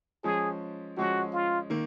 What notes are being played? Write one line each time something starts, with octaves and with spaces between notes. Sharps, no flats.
F3 G#3 C#4 G#4
F3 G#3 C#4 F#4
F4
D#3 A#3